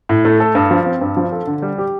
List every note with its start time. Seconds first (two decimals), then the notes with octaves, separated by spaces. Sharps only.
0.09 A2
0.25 A3
0.40 A4
0.55 G2
0.71 F3
0.86 C4
1.01 G2
1.17 F3
1.32 A4
1.47 D3
1.62 G3
1.78 G4